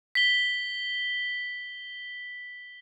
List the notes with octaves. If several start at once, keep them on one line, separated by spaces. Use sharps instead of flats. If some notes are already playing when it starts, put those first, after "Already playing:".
B6 G7